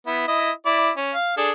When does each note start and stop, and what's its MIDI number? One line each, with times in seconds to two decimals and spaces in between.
0.07 0.28 59
0.07 0.28 64
0.28 0.51 64
0.28 0.51 75
0.66 0.90 64
0.66 0.90 74
0.97 1.13 61
1.14 1.34 77
1.37 1.51 62
1.37 1.51 68
1.37 1.51 69